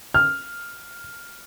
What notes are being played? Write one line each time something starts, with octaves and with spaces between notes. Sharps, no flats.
F6